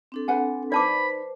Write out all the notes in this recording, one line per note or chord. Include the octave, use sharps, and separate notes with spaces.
C4 D4 A4
B4 F#5 G#5
D#4 B4 C5 D5 A5 B5 D6